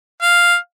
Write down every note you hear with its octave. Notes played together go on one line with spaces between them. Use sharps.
F5